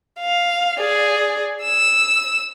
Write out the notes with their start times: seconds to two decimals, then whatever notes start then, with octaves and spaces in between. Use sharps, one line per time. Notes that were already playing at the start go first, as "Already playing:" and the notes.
0.20 F5
0.80 G#4 D5
1.64 E6 E7